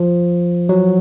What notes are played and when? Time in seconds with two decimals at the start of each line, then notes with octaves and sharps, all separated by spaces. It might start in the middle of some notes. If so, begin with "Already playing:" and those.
Already playing: F3
0.69 F#3